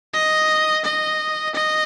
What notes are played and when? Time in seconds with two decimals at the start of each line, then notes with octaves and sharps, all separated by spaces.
0.13 D#5
0.85 D#5
1.55 D#5